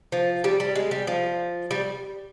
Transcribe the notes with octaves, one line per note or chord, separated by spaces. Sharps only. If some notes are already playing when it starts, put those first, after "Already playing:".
F3
G3
G3
G#3
G3
F3
G3